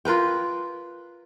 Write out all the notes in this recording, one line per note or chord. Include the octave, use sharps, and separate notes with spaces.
F4 A#4 B4 G5